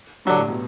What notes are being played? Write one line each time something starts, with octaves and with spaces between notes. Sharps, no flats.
G2 D3 F#3
A2
B2